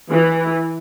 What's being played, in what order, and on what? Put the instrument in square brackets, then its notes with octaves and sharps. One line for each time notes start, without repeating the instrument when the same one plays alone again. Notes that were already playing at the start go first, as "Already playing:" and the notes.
[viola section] E3